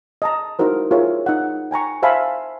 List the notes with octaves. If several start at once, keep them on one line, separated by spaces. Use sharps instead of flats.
D#5 A5 A#5
D#4 E4 F#4 A#4 C5
F4 G#4 A#4 C#5 E5
D#4 F#5
G5 G#5 A#5 C#6
C5 E5 F5 G#5 A5 B5